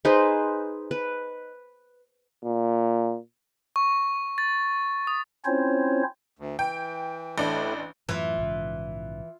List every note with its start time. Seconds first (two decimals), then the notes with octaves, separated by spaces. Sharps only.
0.05 D#4 G#4 B4 C5
0.91 B4
2.45 A#2
3.76 C#6
4.38 A6
5.07 D#6
5.45 C4 C#4 E4 F4 C5 C#5
6.39 D2
6.59 E3 G5
7.38 A1 A2 D4
8.09 F#2 A2 E3 F4 E5
8.38 A#1 G#2 C#3